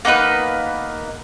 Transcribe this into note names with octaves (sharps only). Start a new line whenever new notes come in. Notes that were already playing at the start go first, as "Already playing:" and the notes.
A#3 B3 D#4 B4